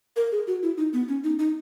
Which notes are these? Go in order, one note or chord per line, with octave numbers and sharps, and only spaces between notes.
A#4
G#4
F#4
E4
D#4
B3
C#4
D#4
D#4